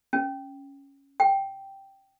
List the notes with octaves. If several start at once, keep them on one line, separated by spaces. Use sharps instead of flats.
C#4
G5